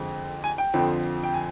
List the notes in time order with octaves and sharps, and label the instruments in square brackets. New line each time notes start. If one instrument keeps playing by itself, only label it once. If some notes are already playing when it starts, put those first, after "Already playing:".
Already playing: [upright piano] F2 D3 G#3 C4
G#5
G5
F2 D3 F3 C4
G5
G#5